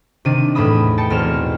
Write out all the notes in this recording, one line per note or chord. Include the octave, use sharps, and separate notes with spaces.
C3 D#3 D4 D#7
E2 A2 A3 E5 B5 D#6
G5 A5 C#7
B1 E2 C4 F6 E7